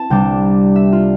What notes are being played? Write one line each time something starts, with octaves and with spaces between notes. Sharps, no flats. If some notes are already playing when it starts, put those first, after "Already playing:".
Already playing: C4 E4 A5
C2 C3 G3 D4 G5
E5
F4